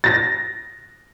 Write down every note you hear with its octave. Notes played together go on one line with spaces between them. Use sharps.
A6 A#6